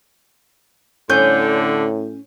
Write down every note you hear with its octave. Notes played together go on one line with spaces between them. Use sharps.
A2 D3 C#4 G6